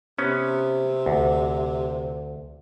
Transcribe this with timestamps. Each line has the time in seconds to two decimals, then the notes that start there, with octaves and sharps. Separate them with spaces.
0.18 C3 B3 C#4
1.06 D2